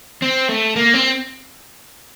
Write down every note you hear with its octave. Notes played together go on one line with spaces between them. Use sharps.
C4
A3
A#3
C4